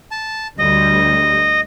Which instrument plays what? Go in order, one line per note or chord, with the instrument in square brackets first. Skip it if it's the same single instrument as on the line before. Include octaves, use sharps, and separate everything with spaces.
[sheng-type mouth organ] A5
[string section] D2 G3 [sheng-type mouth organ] D#5